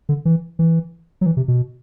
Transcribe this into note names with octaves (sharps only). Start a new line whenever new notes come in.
D3
E3
E3
F#3
E3
C3
B2